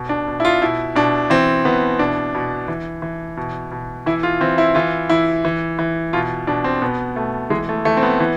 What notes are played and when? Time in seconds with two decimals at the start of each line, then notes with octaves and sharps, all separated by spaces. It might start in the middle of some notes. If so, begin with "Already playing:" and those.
Already playing: B2
0.09 D4
0.27 B2
0.40 E4
0.45 F4
0.62 B2 E4
0.95 B2 D4
1.30 E3 C4
1.65 E3 B3
1.99 B2 D4
2.34 B2
2.68 E3
3.02 E3
3.37 B2
3.71 B2
4.06 E3 E4
4.23 F4
4.41 E3 C4
4.58 E4
4.75 E3 F4
5.10 E3 E4
5.45 E3
5.79 E3
6.13 B2 F4
6.47 B2 D4
6.64 C4
6.82 B2 B3
7.16 B2 A3
7.50 E3 G#3
7.69 A3
7.85 E3 A3
7.97 C4
8.03 B3
8.20 E3